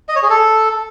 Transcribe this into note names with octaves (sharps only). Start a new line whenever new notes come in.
D#5
C#5
G#4
A4